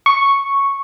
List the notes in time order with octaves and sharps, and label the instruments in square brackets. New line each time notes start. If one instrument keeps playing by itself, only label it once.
[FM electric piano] C#6